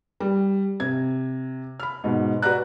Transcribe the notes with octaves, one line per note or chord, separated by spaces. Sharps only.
G3
C3 G#6
B5 F6
G#2 B2
F#4 B4 D5 A#5 F#6